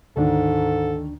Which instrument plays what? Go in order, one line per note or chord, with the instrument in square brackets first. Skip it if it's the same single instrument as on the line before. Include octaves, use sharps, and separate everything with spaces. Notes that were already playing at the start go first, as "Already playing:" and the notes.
[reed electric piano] D2 D4 [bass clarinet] G#2 [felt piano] D#3 [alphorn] A4